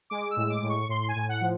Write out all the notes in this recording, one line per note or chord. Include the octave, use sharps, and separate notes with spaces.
G#3 D6
E6
A2
D6
A2
C#6
A2 C6
G#5
A2
F#5
F3